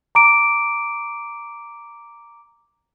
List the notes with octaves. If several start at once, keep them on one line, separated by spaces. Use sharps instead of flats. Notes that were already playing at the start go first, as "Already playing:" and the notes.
A#5 D6 D7